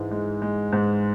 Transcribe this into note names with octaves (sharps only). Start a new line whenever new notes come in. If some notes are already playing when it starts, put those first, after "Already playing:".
Already playing: G#2 E3 G#3
G#3
G#3
G#2